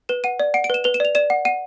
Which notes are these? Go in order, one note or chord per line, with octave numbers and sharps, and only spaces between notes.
B4 E7
F#5 D#7
D5
F#5 D7
D7
B4 E7
B4 F7
E7
D5 F7
D5 E7
F#5
F#5 D#7